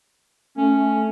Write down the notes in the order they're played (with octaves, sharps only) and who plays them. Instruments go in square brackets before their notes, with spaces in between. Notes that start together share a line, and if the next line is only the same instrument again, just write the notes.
[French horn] A3 [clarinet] C#4